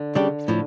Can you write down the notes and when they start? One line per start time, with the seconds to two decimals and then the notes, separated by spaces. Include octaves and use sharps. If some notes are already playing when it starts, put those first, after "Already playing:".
Already playing: D3
0.15 C#3 G3 D4 G4
0.48 A2 F3